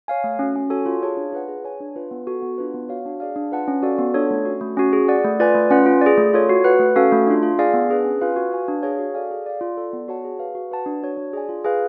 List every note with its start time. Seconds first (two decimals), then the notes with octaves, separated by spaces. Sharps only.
0.08 C#5 F5 G#5
0.24 A3
0.39 C#4 F#4
0.56 C#4
0.70 F#4 A4 C#5 G#5
0.86 F4
1.02 G#4 C#5 F5 A5
1.17 D4
1.33 F4 B4 F#5
1.48 G#4
1.65 C#5 G#5
1.80 D4
1.96 F4 B4
2.11 B3
2.27 F#4 A4
2.42 B3
2.58 D4 F4 B4
2.74 B3
2.89 F#4 C#5 F5
3.06 D4
3.20 G#4 D5 F5
3.36 D4
3.52 F4 B4 F#5 A5
3.68 C#4
3.83 F#4 A4 D5 F5
3.98 B3
4.14 D4 F4 A4 C#5
4.30 A3
4.45 C#4 F#4
4.61 A3
4.77 C#4 F#4
4.93 G#4
5.08 D5 F#5
5.24 A3
5.40 F4 B4 D5 G#5
5.55 A3
5.70 C#4 F4 B4 F#5
5.86 F4
6.01 G#4 D5
6.18 A3
6.34 F4 A4 C#5
6.49 F#4
6.64 B4 F#5
6.80 A3
6.96 C#4 F#4 A4 F5
7.12 A3
7.27 D4 F4
7.43 F4
7.59 G#4 D5 F5 G#5
7.74 B3
7.89 D4 G#4 B4
8.05 C#4
8.21 F4 B4 F5 G#5
8.36 F#4
8.52 B4 F5 G#5
8.68 D4
8.83 G#4 C#5 F5
8.99 F#4
9.14 A4 D5 F5 G#5
9.31 G#4
9.46 D5 F5
9.61 F4
9.77 A4 D5
9.93 B3
10.08 F#4 C#5 F#5 A5
10.24 G#4
10.39 B4 F5
10.55 F#4
10.71 B4 F#5 A5
10.86 D4
11.02 F#4 C#5
11.17 D4
11.33 G#4 D5 G#5
11.49 F4
11.64 G#4 B4 F5 G#5